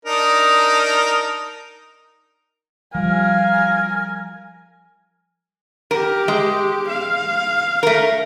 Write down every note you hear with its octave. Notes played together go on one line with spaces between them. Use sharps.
D4 D#4 A#4
F3 G3 A#4 F5 G#5
G4 A#4
G#3
F5
A3 A#4